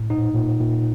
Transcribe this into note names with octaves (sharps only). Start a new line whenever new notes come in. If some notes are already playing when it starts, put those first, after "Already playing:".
Already playing: A2
A#2 D#4
A#2
A#2